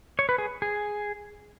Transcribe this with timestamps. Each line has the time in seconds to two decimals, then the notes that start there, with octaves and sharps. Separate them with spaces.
0.19 C#5
0.29 B4
0.38 G#4
0.62 G#4